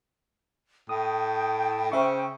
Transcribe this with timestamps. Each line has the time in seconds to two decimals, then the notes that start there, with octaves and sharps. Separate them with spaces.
0.89 A2 G5 D#6
1.92 C#3 C5 E5 C#6